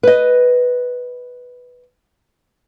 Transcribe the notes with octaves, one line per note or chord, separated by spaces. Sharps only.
B4 D#5